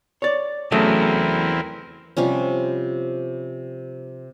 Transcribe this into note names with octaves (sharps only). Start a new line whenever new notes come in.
C#5 D5
E2 C#3 F#3 A3 C4 E4 A#4
C3 F3 G3 C#4